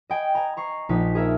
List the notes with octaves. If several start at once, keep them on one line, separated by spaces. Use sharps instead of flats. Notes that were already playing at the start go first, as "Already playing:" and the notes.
D#5 G5 G#5
G#5 A#5
A#5 C#6 C7
A#1 D#4 B6
G#4 A#4 E5